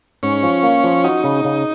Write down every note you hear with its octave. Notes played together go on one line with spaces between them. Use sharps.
G#2 C#4
F3
A#3
F3
D#4 F#4
C#3
C#3